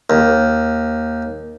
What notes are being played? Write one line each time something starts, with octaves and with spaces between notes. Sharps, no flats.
D#2